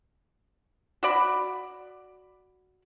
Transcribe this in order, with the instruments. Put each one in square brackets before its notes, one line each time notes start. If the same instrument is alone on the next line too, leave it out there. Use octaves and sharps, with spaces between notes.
[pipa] F#4 D5 B5